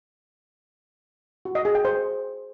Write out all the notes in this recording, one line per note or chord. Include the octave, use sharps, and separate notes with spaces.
F#4
D#5
G#4
G5
C5